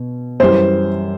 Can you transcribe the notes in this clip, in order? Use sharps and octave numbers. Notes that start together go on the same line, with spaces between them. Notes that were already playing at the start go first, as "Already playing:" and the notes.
Already playing: B2
F#2 E3 G3 C5